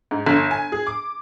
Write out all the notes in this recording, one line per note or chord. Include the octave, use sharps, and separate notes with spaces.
G#2
G1
G#5
G#4
D6